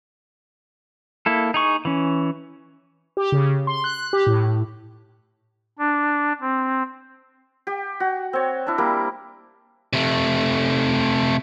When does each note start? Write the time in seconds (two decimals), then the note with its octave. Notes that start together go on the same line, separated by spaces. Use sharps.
1.26 A#3 E4 A4
1.54 D#4 G#4 C#6
1.85 E3 C#4
3.17 G4
3.32 C#3
3.67 C6
3.84 F#6
4.13 G4
4.27 A2
5.79 D4
6.41 C4
7.67 G4
8.00 F#4
8.33 C4 C#5
8.67 D4 E4
8.78 G3 A#3 D6
9.93 C3 A3